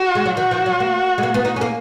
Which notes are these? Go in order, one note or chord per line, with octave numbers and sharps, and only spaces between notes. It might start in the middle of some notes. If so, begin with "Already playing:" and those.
Already playing: F#4
G#3
F#3
D#3 F#4
F3
F#3
A#3
G#3
A#3
B3
D#4
C#4
A#3